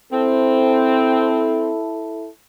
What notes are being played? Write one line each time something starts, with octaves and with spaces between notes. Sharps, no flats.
C4 E4 A4